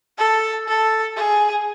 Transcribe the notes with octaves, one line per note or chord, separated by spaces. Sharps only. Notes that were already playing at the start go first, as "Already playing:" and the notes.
A4
A4
G#4